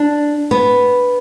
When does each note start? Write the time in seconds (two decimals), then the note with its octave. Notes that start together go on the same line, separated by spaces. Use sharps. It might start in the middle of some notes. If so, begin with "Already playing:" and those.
Already playing: D4
0.51 B3